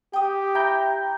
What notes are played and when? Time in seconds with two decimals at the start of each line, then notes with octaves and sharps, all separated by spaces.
0.13 G4 G5 D#6
0.55 E4 G5 A#5 G6